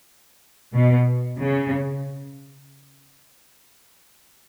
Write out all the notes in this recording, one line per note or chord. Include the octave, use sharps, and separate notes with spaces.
B2
C#3